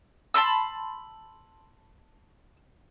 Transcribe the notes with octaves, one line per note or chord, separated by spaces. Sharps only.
A5 B5 C6 E6